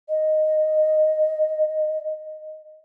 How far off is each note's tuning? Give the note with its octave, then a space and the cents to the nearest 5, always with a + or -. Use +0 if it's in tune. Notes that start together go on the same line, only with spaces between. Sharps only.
D#5 -5